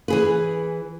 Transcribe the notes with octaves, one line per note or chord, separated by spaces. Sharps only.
E3 G#4 B4